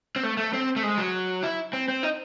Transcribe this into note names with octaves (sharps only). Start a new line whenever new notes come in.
C4
A3
A3
C4
A3
G#3
F#3
E4
C4
C4
D#4